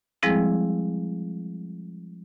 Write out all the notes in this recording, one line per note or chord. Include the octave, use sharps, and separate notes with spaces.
F3 G3 G#3 C4 E4 G#4